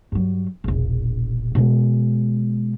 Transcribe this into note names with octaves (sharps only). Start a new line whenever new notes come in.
G2 F#3
E1 A#1
B2 G#3